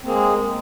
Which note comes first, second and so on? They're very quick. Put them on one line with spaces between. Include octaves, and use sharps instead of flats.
C4 A#3 G#4 G#3